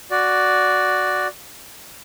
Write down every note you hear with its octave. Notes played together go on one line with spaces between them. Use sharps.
F#4 D5